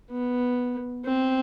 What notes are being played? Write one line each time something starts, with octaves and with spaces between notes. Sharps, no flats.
B3
C4